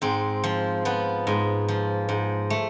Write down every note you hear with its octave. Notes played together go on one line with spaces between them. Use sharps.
G#2 C4
F3
F3 B3
G#2
F3
G#2
A3